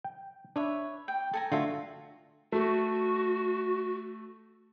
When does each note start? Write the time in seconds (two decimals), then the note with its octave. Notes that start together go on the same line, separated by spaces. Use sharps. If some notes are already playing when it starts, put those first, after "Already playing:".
0.04 G5
0.56 D4 B4 C#5 E5
1.08 G5
1.33 A4 G#5 A#5
1.52 D3 A3 F4 F#4 E5
2.52 A3 F#4